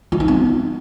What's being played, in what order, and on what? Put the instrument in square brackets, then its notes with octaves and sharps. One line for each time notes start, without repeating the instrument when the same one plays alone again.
[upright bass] F4
D#4
B3